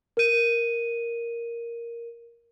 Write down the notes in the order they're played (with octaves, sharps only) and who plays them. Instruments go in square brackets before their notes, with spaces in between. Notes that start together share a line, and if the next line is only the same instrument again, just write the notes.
[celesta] A#4 D#7